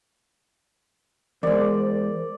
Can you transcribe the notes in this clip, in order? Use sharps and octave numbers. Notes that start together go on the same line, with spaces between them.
E2 G#3 A#4 C5 D5